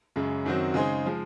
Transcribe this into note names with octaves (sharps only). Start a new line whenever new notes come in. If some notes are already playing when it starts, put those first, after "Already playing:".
F#2 C#3 G#3
F#2 D#3 F#3 C4 F#4
C#3 G#3 D#4 G#4 C5
F3 G#3